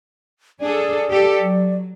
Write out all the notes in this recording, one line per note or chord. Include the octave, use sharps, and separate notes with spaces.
D4 G#4 A4 D5
G4 A4
F#3